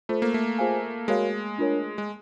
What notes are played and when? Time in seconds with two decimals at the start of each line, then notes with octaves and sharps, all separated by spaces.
0.09 A3 F4 A4 C5
0.22 A#3
0.34 A3
0.59 F4 G#4 C5 F5 G#5
1.08 G#3 F#4 A#4 C#5 F5
1.58 D4 F4 A#4 C#5
1.98 G#3